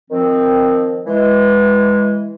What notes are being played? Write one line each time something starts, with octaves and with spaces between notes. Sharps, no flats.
D#3 F3 C4
E3 G#3